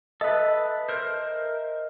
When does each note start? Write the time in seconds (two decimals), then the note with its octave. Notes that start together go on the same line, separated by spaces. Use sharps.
0.21 A4 B4 D#5 E5
0.89 A#4 C5